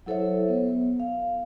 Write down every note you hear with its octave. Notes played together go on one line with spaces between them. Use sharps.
F#3 E4 A4 C5 C#5 E5
B3
F5